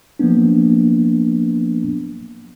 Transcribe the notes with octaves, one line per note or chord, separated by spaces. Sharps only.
F3 F#3 A#3 B3 D4